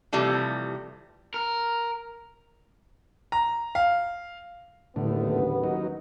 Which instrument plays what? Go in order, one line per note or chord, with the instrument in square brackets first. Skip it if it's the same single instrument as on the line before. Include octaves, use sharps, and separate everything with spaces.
[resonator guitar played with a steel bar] C3 E3 F3 G3 A3
[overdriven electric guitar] A#4
[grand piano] A#5
F5
[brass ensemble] F#1 D#2 B3 [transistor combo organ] A2 D3
[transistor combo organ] F#3 D#4